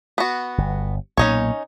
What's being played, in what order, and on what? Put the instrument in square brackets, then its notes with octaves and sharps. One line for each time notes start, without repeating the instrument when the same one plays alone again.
[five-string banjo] B3 F#4
[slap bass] G1
[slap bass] B1 A#2 A#3 [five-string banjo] C#4 D#4 C#5